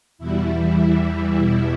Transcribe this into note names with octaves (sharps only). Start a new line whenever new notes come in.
E2 B2 G3 E4
E2 E3 G3
E2 E3 G3 E4
E2 E3 G3 E4
E2 B2 G3 E4